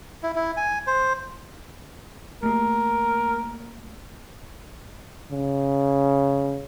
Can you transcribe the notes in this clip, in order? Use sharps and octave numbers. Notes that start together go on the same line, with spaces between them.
E4
E4
G#5
C5
A3 A#3 A#4
C#3